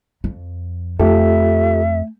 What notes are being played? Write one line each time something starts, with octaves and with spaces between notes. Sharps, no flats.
F2
F2 A3 F4 G4 A4 E5